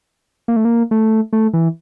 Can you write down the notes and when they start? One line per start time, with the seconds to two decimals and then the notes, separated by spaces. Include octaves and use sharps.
0.48 A#3
0.56 A3
0.65 A#3
0.91 A3
1.33 A3
1.54 E3